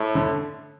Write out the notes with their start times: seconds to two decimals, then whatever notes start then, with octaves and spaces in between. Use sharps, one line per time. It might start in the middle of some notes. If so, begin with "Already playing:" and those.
Already playing: A2
0.15 D3